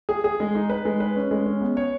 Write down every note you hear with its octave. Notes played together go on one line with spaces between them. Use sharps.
G#4
G#4
G#3
D#4
B4
G#3
B4
C#4
G#3
C#4
B3
C#5